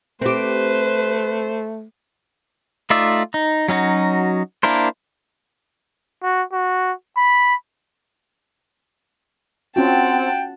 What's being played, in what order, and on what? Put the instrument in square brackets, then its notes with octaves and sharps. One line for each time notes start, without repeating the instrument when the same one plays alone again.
[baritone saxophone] A3 [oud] C4 G4 [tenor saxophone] B4 [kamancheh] C5
[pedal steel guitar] A3 D#4 F4 D5 E5
D#4
F#3 C#4 D#4 F#4
A#3 D4 E4 A#4 C5
[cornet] F#4
F#4
B5
[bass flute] C4 [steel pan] C#4 F4 F#4 [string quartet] F#5 A5 [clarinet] G5